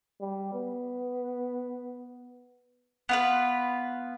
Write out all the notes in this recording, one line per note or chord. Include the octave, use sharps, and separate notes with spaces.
G3
B3
B3 F4 B4